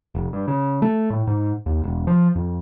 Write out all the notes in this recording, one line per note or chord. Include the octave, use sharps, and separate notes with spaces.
F1
G2
C#3
A3
A2
G#2
D#2
E1
F3
F2